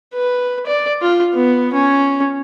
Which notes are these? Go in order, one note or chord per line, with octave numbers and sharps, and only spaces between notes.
B4
D5
F4
B3
C#4